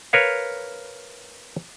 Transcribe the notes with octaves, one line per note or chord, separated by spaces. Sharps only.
A#4 B4 C#5 F5